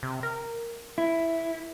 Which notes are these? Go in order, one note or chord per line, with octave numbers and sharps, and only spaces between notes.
C3
A#4
E4